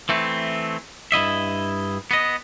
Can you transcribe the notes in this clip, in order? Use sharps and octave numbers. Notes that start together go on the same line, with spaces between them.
E3 A3 C4
G2 E4 D#5 E5
B3 D#5